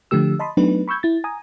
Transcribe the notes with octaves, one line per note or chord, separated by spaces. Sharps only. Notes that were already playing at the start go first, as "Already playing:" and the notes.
D3 F3 A3 G4 E6
D#5 A5 B5 C6 D#6
F#3 A3 B3 D4 D#4 B4
B5 C#6 E6 G6 G#6
E4 A6
G#5 A#5 D#6